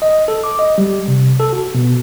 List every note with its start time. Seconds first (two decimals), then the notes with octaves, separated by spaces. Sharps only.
0.02 D#5
0.28 A4
0.44 D6
0.59 D#5
0.78 G3
1.08 C3
1.40 A4
1.53 F#4
1.74 B2